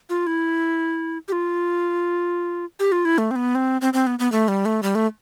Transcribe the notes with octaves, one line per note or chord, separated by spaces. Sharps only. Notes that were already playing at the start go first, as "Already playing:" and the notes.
F4
E4
G4
F4
G4
F4
E4
A3
C4
B3
C4
C4
C4
B3
B3
A3
G3
A3
G3
A3